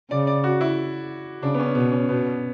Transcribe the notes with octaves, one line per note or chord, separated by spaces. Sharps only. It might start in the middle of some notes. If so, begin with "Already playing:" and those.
C#3 D5
D5
F#4
E4
C#3 D4
B3
C#4
B2 B3
C#4
B2 B3